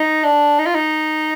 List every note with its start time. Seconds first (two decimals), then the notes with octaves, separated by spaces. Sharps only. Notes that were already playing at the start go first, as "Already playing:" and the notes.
Already playing: D#4
0.24 D4
0.59 D#4
0.66 F4
0.75 D#4